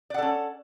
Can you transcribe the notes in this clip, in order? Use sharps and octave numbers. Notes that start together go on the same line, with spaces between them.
C#4 A4 D5 F#5